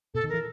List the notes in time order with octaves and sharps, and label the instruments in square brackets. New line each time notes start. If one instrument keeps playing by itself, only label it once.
[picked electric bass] B2 [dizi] A4
[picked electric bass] D#3
[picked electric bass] E3 [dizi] A#4